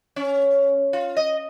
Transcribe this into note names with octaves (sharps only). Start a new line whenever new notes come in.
C#4
F4
D#5